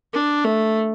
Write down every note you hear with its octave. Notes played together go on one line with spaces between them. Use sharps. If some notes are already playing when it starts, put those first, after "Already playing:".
D4
A3